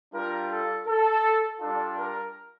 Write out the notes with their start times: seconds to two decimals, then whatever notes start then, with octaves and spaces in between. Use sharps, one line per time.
0.14 G3 D4 F4 A#4
0.51 A4
0.87 A4
1.61 G3 D4 F4 A4
1.97 A#4